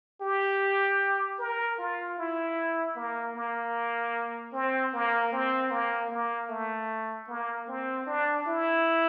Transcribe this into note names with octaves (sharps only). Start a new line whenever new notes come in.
G4
A#4
F4
E4
A#3
A#3
C4
A#3
C4
A#3
A#3
A3
A#3
C4
D4
E4